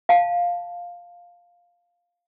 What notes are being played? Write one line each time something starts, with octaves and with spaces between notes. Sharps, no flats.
F5 A5